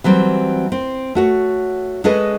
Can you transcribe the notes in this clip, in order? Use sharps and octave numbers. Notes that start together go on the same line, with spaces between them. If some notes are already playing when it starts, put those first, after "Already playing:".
E3 F#3 G3 C4
C4
A3 F#4 C#5
G#3 C#4 G#4 A4 B4 D#5